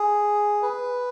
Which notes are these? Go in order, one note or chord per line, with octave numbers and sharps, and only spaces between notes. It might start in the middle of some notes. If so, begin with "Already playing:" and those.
Already playing: G#4
B4